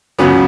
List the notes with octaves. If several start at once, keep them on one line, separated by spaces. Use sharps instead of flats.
C#2 C#3 F#3 B3 C#4 B4